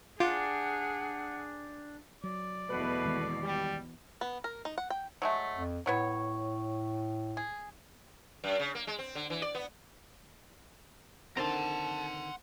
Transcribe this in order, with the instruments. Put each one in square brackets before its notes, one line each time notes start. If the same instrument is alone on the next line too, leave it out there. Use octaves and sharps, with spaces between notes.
[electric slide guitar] D4 G4 [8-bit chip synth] F4 [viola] G#4 [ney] F#5
[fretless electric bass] F#3 [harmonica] D5
[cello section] E2 B2 [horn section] A3 B4
[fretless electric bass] D#3 G#3 B3
[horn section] G3
[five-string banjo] B3
A#4
D#4
F#5
G5
[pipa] F#3 G#3 A3
[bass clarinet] F2
[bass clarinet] A2 [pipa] F#3 B3 C#5
[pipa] G#4
[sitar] F#2
C#3
A#3
G#3
C4
D3
E3
D5
B3
[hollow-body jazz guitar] D3 D#3 C4 [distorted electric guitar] F#5 C6 [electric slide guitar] A5 A#5